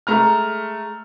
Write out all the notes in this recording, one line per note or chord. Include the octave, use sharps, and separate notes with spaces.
G#3 A3 A#5 F6